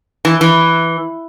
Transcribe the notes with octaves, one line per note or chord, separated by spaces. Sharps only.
E3
E3